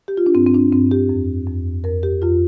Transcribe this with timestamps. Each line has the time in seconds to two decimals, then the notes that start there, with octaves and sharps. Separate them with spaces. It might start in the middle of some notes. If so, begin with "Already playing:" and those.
0.08 G4
0.17 F4
0.26 D4
0.35 G2 C4
0.47 C4
0.54 D4
0.72 G2 C4
0.91 G4
1.09 F2
1.47 F2
1.84 F2 A#4
2.03 G4
2.22 F2 F4